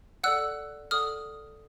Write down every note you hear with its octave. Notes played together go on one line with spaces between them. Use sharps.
A4 D5 F#5 E6 F#6
A4 D5 F#5 D#6 F6